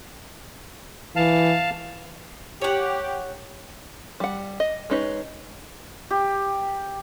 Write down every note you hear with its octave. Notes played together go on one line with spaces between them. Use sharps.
E3 F5 A5
G4 C#5 F#5
G3 F#5
D#5
G#3 C#4 D#4 B4 C#5
G4